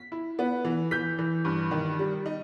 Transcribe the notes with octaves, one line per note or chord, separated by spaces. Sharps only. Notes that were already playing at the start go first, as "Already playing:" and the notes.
Already playing: B6
E4
B3
E3
E3 G6 B6
E3
G2
D#3
G3
D#4